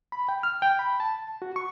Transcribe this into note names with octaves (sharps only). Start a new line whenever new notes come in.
B5
G5
F6
G5
B5
A5
F#4
C#6